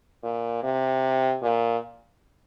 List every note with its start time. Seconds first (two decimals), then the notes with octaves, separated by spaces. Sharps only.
0.23 A#2
0.63 C3
1.42 A#2